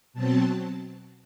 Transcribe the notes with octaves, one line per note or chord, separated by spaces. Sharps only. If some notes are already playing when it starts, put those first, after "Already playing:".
B2 F#3 C4 A5